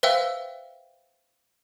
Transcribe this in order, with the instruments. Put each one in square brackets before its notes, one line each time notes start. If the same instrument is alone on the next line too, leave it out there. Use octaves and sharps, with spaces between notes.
[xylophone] B4 C5 E5 F5 G5 E6